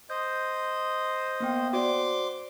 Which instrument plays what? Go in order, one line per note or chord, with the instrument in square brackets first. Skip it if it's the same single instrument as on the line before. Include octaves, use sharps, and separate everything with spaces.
[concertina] C5 D#5 [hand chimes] G6
[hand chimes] A#3 B3 G5
[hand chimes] F#4 C5 D5 [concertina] C6 D6